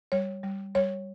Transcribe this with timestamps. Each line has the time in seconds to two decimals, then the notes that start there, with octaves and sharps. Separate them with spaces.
0.12 G3 C#5
0.43 G3
0.75 G3 C#5